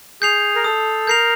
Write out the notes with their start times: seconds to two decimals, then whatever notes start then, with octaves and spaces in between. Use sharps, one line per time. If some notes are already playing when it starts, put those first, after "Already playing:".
0.22 G#4 G6 C7 F7
0.55 A#4
0.64 A4 D#6
1.07 A#4 G6 C7 F7